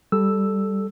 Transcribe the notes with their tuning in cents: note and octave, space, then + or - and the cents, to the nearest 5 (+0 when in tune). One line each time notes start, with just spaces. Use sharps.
G3 +0 A4 -5 E6 +0